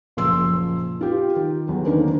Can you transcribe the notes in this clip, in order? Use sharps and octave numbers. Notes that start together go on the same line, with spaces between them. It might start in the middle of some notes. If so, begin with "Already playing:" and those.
F#1 A#2 F3 C6 E6
F4 G4
D#3
E2 F#3
D3 D#3 A#3 C#4 D4 C5